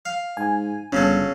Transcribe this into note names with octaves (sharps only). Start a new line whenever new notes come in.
F5
G#2 G#5
G1 C#3 F#3 C#4 A4